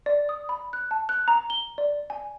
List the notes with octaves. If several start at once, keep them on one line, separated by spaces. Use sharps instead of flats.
D5
D#6
B5
F#6
A5
F#6
A#5
G7
D5
G#5